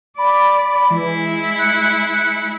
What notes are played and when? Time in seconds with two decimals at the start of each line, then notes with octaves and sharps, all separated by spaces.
0.18 D5 B5
0.90 E3 G#3 E4
1.56 F#6 C#7